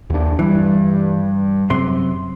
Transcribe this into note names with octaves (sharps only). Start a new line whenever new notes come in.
D#2 D4
G2 E3 G3
F#2 C3 C6